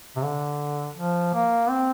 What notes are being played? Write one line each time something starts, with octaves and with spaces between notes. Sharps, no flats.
C3
D3
F3
A#3
C4